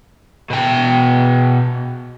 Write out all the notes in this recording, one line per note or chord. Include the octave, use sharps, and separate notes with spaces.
B2 G5